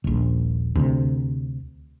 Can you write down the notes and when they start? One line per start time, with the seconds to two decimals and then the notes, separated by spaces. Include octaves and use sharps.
0.04 D#1 A#1
0.75 D2 C3